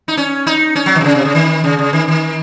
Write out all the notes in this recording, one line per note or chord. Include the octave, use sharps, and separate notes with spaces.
D#4
C#4
D#4
C#4
F#3
D#3
C3
C#3
C3
C#3
D#3
C#3
C#3
D#3
D#3